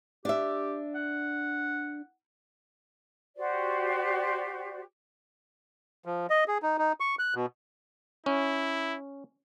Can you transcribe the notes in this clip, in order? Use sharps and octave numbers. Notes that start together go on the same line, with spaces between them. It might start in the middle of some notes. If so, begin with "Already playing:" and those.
D4 G4 E5
F#5
F#4 G4 C5 D5
F3
D#5
G#4
D#4
D#4
C#6
F#6
B2
C#4 E4